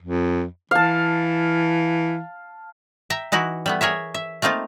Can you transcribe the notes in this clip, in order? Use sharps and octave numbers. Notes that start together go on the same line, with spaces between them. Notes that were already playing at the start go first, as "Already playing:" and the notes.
F2
E3 F5 A5
E5 G5 A#5
E3 D#4 E4 F#4
G3 A3 B3
G#4 A#4 C#5 E5
E5
A3 A#3 C4 D#4 F4